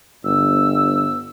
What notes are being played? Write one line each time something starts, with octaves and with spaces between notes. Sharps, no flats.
G1 E6